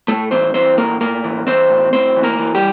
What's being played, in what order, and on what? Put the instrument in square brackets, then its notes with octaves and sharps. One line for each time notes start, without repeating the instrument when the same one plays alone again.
[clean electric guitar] A2 A3 A4
E3 C4 C5
E3 C4 C5
A2 A#3 A#4
A2 A#3 A#4
E3
E3 C4 C5
A2
A2 C4 C5
E3
A#3 A#4
E3
G3 G4